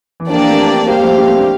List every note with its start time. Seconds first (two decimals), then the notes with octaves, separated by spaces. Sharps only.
0.20 E3
0.29 F3 A#3 D4 G4 D5
0.39 E3
0.49 A3 C4
0.88 G3 A#3 G4 C5 F5
1.02 F3 A3
1.18 G3 A#3
1.27 A3 C4
1.37 A#3 D4